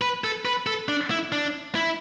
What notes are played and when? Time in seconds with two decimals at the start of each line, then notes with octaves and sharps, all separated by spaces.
0.01 B4
0.24 A4
0.45 B4
0.67 A4
0.89 D4
1.11 E4
1.32 D4
1.75 E4